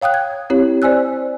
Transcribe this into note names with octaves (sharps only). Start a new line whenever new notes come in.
C#5 F5 G5 D#6 F#6
G#6
C4 E4 G4 C#5
C5 D5 G#5 E6 F#6